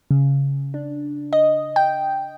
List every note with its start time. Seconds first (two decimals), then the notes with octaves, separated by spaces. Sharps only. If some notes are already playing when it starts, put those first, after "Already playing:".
0.11 C#3
0.74 D4
1.33 D#5
1.76 G5